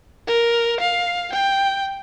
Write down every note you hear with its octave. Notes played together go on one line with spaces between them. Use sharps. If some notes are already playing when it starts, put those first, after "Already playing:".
A#4
F5
G5